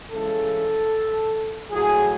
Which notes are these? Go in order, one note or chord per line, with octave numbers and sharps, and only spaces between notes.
C#3 E3 G#3 A4
A2 F#3 G#4